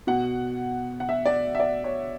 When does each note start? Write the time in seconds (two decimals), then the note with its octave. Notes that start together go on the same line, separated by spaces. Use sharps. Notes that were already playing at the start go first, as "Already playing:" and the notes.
0.07 B2 F#5
1.00 F#5
1.09 E5
1.26 D5
1.55 E5
1.60 D5
1.84 C#5